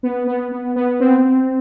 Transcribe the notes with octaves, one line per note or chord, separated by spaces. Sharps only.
B3
B3
B3
B3
C4
C4